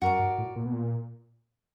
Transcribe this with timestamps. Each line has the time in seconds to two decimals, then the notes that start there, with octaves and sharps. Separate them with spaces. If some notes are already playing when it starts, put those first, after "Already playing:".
0.02 F#2 F#4 A#4 D5
0.19 G2
0.38 A2
0.56 A#2
0.65 B2
0.73 A#2